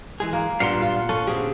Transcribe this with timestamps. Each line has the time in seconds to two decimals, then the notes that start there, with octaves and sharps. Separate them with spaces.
0.20 E3 G#3 G#4
0.33 A#3
0.60 A#2 G3 B3 D4 F5 F#5 C6
0.82 F4
1.09 C#4 A4
1.27 D3 C4 G4 G#4